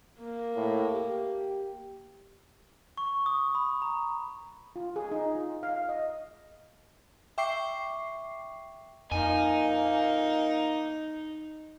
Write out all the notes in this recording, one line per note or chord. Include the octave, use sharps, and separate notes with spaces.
A#3
A2
G4
C#6
D#6
B5
A#5
F4
G#4
D#4
F4
F5
D#5
E5 G5 C#6 D6 C7
F2 A#2 A#3 D#4 G#5